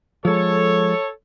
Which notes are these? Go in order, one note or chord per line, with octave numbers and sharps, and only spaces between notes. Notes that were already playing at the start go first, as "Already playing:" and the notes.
F3 G#3 A4 C#5